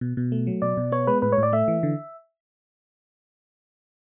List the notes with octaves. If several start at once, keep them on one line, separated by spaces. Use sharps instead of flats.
B2
B2
A3
F#3
B2 D5
B2
B3 C#5
G#3 B4
A2 B4
C#5
A2
D5
A3 E5
E3
D3